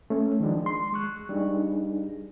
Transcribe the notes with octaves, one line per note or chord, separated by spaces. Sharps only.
A3 C#4
D#3 F3 G#3 D4
C6
G#3 C#6 F#6
G3 D4 D#4 G#4